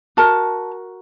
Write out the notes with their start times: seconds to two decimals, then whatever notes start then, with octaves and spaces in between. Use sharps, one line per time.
0.17 F#4 A#4 A5